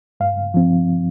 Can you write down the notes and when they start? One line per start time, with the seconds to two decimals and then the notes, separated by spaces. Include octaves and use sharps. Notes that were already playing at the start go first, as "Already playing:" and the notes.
0.20 G2 F5
0.54 F3 C4